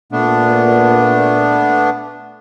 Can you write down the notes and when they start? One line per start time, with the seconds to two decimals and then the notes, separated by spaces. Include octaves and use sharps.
0.12 A#2 A3 B3 D4